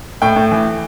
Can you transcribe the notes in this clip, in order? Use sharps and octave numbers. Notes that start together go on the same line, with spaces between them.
A2 G5
A2
E3